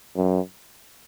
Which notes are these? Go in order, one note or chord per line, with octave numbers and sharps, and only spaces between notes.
F#2